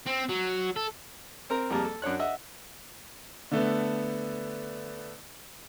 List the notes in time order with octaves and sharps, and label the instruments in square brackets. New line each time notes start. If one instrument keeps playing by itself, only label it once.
[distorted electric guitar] C4
F#3
A4
[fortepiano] C4 A#4 A#5
F2 G3 A#3 G#4 A5
A4
F#2 D4 C#5 F#6
D#5 E5 F#5 E6
[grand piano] D3 A3 B3